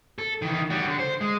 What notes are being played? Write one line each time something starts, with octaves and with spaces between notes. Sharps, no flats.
A4
D#3 E3
G3 F#4
D3
C5
G#3